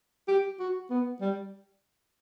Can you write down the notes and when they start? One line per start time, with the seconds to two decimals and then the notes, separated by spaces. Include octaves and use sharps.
0.28 G4
0.59 F#4
0.90 B3
1.21 G3